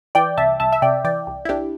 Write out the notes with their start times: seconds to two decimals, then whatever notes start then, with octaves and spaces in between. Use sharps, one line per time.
0.15 E3 D5 G5
0.37 C2 E5 A5
0.60 C2 E5 A5
0.72 E5
0.82 C3 D5 G5
1.04 E3 D5 G5
1.27 C2
1.45 E4
1.49 C2 D4 G4